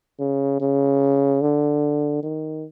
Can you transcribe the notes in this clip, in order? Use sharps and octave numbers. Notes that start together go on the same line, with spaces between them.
C#3
C#3
D3
D#3